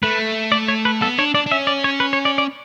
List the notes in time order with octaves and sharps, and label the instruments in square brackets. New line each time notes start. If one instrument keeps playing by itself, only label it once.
[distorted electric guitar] A3 [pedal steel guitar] B4
[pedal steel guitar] D5
C#5
B4
[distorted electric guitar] B3 [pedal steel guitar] A4
[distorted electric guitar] D4 [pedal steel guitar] C#5
[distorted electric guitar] D4 [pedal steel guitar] D5
[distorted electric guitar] D4
[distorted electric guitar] C#4 [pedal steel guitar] E5
[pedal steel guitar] D5
C#5
B4
C#5
D5
D5